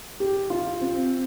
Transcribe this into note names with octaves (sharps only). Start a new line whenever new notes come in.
G4
F4
C4